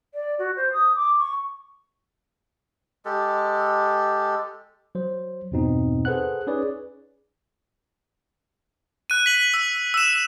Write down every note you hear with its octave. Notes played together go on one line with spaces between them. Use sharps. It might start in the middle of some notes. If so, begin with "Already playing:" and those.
D5
F#4
C5
D#6
D6
C#6
G#3 G4 A4
F#3 C5
E2 G2 B2 C4 D#4
G#4 A4 B4 C5 F#5 F#6
C#4 D#4 G#4 B4 C#5 D5
F#6 D#7
B6 F#7
E6
E6 E7